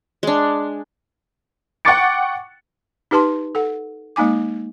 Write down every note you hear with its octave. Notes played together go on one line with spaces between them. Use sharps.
G#3 D4
F#5 G5 C#6 D6 A6 C#7
D#4 G4 B4 A5 C6
A4 F#5
G#3 A#3 D#4 G#5 D6